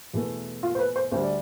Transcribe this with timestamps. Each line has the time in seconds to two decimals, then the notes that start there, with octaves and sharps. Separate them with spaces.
0.14 E2 B2 A3
0.63 F4
0.75 C5
0.79 B4
0.96 C5
1.11 D2 D3 G3 C5
1.24 D5